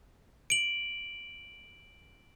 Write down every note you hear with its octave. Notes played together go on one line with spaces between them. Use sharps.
D7 F#7